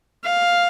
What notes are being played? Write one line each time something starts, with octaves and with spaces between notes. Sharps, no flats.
F5